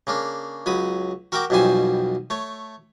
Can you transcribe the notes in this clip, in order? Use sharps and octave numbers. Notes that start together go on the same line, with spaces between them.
C#3 A#3 D4
C#2 F#3 B5 D#6
F#4 A#4 E5 F#5 G5 D6
B1 F2 B2 G3 C5 G#5
A3 C#5